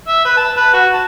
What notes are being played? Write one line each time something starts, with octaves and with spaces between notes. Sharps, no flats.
E5
B4
A5
B4
F#4
A5